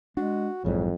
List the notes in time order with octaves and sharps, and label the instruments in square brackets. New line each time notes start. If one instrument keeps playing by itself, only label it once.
[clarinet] G#3 [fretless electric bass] D4 [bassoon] F#4
[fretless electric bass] A#1 G#2 E3 [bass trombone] F2 [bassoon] C#3 [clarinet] F#3